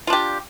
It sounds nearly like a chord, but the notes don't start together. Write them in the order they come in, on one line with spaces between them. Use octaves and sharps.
F4 D4 G4